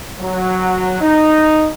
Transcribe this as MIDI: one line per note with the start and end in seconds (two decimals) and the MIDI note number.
0.20 0.98 54
1.01 1.68 63